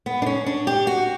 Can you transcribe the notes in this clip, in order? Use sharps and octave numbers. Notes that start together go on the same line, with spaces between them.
B3
D4
C#4
D4
G4
F#4